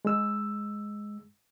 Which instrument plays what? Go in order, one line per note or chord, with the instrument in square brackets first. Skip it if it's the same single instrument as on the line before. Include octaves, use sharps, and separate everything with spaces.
[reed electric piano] G#3 E6